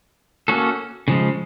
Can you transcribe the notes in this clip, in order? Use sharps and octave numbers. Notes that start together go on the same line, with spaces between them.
A#3 C#4 F#4 A4
C#3 F3 G#3